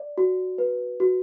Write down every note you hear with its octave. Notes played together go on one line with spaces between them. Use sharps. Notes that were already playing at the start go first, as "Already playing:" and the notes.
Already playing: D5
F#4
B4
F#4